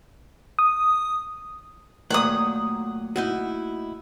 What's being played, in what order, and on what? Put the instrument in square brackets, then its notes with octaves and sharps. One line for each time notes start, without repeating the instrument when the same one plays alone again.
[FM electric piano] D#6
[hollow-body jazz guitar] A#2 D#3 F#3 [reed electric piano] A3 A#3 [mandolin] F#5 D#6
[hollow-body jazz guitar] D#4 E4 F#4